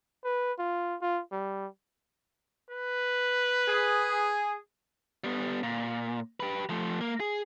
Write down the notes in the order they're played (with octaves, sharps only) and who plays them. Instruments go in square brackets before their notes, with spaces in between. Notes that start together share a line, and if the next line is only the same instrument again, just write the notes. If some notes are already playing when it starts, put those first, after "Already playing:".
[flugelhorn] B4
F4
F4
G3
[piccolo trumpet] B4
[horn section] G#4
[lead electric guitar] G3 B3
A#2
G4 B4
F3 A3
A#3
G#4